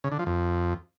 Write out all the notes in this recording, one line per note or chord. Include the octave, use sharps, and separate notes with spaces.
C#3
D3
F3
F2